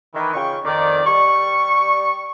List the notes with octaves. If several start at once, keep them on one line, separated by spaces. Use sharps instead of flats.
D#3 E3
C#3 F4 G5 C#6
F2 D#3 D5
G3 C#6